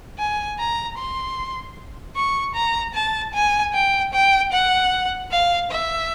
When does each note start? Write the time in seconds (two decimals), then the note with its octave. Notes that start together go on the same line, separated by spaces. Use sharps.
0.19 G#5
0.59 A#5
0.98 C6
2.16 C#6
2.55 A#5
2.94 A5
3.34 G#5
3.74 G5
4.13 G5
4.53 F#5
5.31 F5
5.71 E5